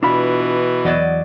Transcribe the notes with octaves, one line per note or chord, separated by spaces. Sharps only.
B2 E3 D4 F4 B5
E2 F#3 D5 D#5